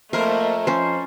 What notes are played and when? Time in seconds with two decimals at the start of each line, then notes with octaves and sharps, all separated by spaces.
0.13 F2 A3 A#3 A#4 C5
0.67 F3 C#4 C5